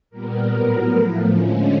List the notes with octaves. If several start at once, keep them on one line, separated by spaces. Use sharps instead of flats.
A#2 G3 B3 A#4
A2 F#3 B3
A2 F3 A3
D3 F3 G#3 C#4